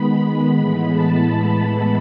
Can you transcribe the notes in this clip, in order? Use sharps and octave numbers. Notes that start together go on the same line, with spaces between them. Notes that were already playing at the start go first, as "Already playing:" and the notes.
Already playing: D#3 G#3 B3 B5
A2 E3 G#3 B3 B5
A5